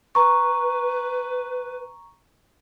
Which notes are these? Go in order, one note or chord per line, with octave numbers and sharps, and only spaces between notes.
B4 A#5 C#6